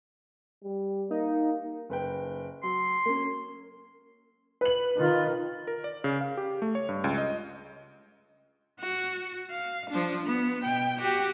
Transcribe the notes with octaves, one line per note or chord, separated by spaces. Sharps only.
G3
A#3 D#4
F#1 B4 G5
F#3 C6
A#3 C#4
B4 F#7
D#3 F4
A#4
D5
C#3
F5
G4
A3
C#5
G2
C#2
D#5
F#4
F5
F3 D4
B3
B2 G5
F#4 G4